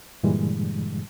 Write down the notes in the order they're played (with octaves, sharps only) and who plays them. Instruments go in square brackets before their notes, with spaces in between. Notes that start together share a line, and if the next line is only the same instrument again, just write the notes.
[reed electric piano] G2 A#2 D3 E3 G3 G#3